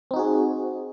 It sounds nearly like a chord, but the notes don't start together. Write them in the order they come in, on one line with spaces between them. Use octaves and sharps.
C4 D#4 F#4 G#4